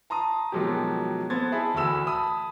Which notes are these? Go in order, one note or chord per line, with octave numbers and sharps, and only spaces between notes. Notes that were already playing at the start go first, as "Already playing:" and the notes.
A5 A#5 C6 D#6
B2 D#3 F3 F#3 G#3 G4
B3 A4 C5 G#6 A6
E4 G#4 A5 B5
D2 E3 A3 B5 E6 E7
A5 B5 D#6 E6